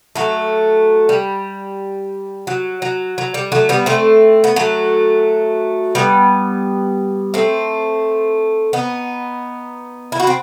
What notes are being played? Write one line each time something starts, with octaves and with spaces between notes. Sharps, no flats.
F#3 A3
G3
F#3
F#3
F#3
G3
F#3 A3
G3 B3
A3 C4
B3
F#3 A3
G3 B3
A3 C4
B3 D#4
E4
F#4
C4